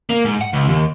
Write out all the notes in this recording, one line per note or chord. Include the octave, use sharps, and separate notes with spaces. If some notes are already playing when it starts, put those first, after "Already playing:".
A#3
G#2
F#5
C#2
D#2